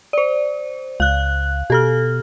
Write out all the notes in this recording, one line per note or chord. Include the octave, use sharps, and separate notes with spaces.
C5 D5
C#2 F5 F#6
B2 G4 A4 F6